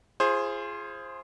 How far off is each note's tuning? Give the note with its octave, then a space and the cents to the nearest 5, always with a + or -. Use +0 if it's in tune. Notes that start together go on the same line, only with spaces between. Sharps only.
F4 -35 G#4 +0 C5 +20